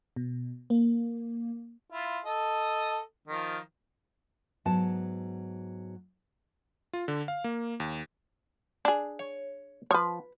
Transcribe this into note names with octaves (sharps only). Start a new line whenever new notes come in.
B2
A#3
E4 F4
A4 D#5
D#3 F3
G#2 F#3 B3 F#5 A5
F4
D3
F5
A#3
D#2
D4 G#4
C#5
F3 B4 C#5